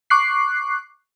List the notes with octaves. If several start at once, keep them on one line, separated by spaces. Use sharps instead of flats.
C#6 D6 F#6 C7